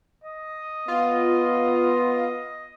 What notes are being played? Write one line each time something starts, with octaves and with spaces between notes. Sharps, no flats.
D#5
B3 F4